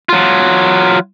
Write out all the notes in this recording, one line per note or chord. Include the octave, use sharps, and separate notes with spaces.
F#3 F4